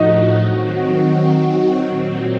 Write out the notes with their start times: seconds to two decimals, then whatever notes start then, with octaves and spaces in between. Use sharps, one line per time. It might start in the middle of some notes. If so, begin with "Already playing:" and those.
Already playing: A2 F3 A3 D#4 F#4 D#5
0.39 D#3 F#3 C4 F#4
1.87 A#2 F#3 C4